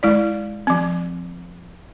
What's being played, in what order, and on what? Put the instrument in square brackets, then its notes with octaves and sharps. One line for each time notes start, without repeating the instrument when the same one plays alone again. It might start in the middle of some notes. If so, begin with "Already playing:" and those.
[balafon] G#3 E4 D5
F3 C4